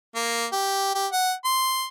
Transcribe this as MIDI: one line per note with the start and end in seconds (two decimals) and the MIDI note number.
0.16 0.46 58
0.53 0.92 67
0.95 1.07 67
1.13 1.34 78
1.45 1.86 84